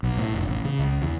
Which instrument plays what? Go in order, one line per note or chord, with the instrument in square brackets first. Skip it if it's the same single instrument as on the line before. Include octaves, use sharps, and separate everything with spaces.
[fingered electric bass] B1
A2
F1
A1
C#3
C#2
E2